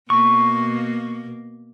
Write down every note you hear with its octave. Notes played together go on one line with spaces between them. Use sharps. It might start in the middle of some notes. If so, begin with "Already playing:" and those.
B2 A#3 C#6